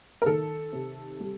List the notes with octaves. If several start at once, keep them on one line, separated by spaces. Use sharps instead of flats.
A#4
D#3 A4
C3
G3